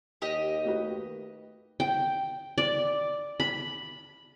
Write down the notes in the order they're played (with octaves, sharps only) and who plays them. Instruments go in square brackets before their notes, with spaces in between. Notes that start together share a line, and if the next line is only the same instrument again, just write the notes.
[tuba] D#2 [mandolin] G4 D#5
[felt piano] A3 F#4 B4
[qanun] G5
D5
B5